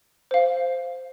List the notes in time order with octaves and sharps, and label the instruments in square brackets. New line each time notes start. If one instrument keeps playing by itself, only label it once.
[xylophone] C5 F5